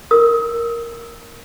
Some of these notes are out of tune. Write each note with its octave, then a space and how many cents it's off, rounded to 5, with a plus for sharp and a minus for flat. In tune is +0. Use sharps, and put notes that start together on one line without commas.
A#4 +0 D#6 +35